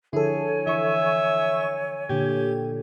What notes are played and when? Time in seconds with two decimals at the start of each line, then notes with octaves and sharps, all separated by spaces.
0.13 D3 F3 E4 G#4 A4 C#5 G#5
0.67 E3 E5 C#6
2.09 A#2 D3 G4 G#6